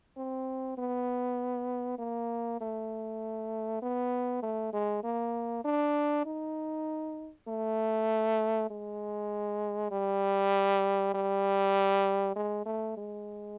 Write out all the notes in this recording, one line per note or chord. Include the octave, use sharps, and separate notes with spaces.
C4
B3
A#3
A3
B3
A3
G#3
A#3
D4
D#4
A3
G#3
G3
G3
G#3
A3
G#3